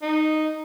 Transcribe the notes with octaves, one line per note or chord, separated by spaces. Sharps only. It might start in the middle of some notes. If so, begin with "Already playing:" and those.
D#4